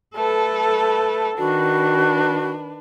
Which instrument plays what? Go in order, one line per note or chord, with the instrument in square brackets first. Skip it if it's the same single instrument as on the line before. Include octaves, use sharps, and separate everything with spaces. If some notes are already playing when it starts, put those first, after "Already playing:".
[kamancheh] A3 B4 [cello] A4
[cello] D#3 [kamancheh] D4 B4 [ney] F#4